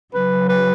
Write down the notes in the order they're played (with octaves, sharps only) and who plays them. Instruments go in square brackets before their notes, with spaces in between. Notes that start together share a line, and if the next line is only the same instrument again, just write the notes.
[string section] C#3 F#3 [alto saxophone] B4
[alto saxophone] B4